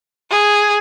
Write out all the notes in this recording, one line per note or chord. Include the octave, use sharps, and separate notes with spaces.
G#4